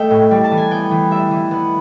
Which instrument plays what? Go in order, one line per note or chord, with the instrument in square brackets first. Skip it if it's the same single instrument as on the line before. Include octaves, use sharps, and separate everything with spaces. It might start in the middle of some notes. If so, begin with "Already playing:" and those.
Already playing: [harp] A3 D#5 G5
A2
G3
A5
E3
G#5
B3 G5
E3
G3 E5
E3
B3